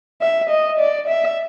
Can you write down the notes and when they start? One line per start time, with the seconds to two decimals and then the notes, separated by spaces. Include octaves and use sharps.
0.22 E5
0.50 D#5
0.79 D5
1.08 E5